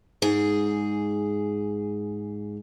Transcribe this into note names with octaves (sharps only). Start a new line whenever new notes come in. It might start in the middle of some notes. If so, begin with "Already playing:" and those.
G#2 G#4